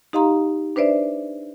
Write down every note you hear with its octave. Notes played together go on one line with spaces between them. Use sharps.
D#4 G4 D#5 F5 A#5 C6
D4 B4 C5 D5 E5